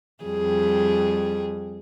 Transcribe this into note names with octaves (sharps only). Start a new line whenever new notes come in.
F2 G3 G#4